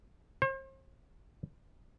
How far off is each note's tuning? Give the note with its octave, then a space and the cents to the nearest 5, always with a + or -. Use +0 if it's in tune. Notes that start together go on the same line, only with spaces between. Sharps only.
C5 +40